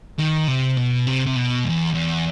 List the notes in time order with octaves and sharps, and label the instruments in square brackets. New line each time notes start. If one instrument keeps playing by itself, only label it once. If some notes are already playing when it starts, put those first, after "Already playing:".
[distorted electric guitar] D#3
C3
B2
C3
C3
B2
E2
E2